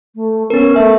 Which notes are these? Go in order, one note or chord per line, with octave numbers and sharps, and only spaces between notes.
A3
B3 C#4 A#4
A3 E5